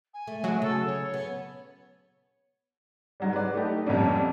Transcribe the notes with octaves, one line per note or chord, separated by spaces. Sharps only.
G#5
A3
F#3 G#3
C#3 A4
C#5
B3
G#2 F#3 G3
B4 D5
A3 D#4 G4
F2 A#2 F#3 G3 C#4 D4